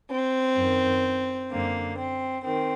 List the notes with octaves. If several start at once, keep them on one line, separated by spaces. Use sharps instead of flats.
C4
F#2 D#3
F#2 D3 A#3
C4
D#3 C4